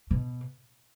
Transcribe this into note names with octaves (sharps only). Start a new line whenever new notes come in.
B2